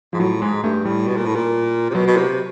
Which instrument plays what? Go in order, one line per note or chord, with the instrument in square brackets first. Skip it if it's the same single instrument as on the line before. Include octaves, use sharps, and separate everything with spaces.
[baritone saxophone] G#2 [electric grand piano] F3
[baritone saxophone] A2 [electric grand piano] F#3
[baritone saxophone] G#2 [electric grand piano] G#3
[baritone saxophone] G2 [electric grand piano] A3
[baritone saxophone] A2 [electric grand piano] G3
[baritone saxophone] B2
A#2
A2
A#2
C3
[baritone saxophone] B2 [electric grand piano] F#3
[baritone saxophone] B2
C3